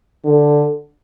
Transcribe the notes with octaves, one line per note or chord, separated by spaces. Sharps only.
D3